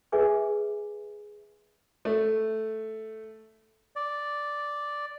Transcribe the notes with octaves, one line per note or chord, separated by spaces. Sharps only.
G#4 B4 E5 G#5 D6
A3
D5